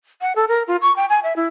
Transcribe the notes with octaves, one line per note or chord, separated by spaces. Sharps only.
F#5
A4
A#4
F4
C#6
G5
G#5
E5
E4